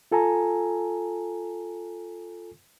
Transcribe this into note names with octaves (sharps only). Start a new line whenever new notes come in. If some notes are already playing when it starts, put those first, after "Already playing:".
F4 A4 G#5 A#5